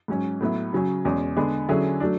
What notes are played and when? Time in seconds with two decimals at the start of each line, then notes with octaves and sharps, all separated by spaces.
0.08 G#2 F#3 C#4
0.41 A2 F#3 B3 E4
0.73 C#3 F#3 C#4 G#4
1.05 E2 B2 G#3 C#4 G#4
1.36 D3 G#3 B3 D4 G#4
1.69 D3 F#3 C#4 E4 G#4
2.00 F#3 A3 D4